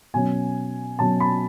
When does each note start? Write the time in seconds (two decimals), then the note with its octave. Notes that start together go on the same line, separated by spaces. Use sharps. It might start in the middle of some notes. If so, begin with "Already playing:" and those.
0.14 B2 F#3 C#4 G#5
0.99 B2 F#3 C#4 A5
1.20 B5